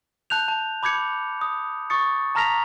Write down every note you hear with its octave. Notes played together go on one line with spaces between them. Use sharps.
A5 F#6 G6 F7
A5
B5 D6 G6 G#6 C#7
D#6
C#6 D#6 A6 C#7
A5 A#5 F6 A#6 B6 F7